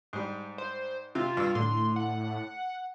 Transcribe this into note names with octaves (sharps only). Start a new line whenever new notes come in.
G#2 G3
C5
C3 F4
G2 E6
A2 D3 C6
F#5